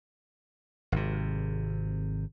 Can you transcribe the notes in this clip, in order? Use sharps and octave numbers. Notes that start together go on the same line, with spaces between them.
G#1 C3